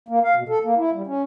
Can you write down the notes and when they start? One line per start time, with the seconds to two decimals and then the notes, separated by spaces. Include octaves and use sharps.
0.09 A#3
0.24 F5
0.35 B2
0.49 A4
0.64 A#3
0.77 E4
0.94 G3
1.07 C#4